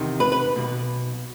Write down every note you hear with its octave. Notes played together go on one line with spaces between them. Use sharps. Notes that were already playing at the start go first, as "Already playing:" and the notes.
Already playing: E2 C3 D#3
B4
B4
B1 B2